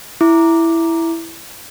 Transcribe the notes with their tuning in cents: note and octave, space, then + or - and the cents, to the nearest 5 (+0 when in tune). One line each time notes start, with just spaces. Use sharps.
E4 +5 D6 +0